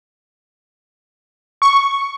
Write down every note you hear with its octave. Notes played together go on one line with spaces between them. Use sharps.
C#6